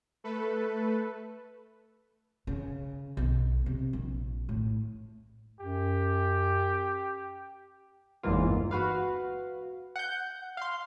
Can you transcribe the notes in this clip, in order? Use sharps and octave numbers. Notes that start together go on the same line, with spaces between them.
A3 A4 B4
C#3
B1
C3
A#1
A2
F#2 G4
G1 E2 G#2 E3 A#3 F4
F#4 B4 F5
F#5 G6
F5 C6